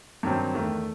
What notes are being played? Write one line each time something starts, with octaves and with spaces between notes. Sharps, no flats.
G2 D#3 F#3 C4
E2 D#3 A3